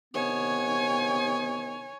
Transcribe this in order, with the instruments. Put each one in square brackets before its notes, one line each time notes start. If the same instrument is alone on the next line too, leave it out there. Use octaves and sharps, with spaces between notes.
[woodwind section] C3 D#3 B3 [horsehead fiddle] C#5 G#5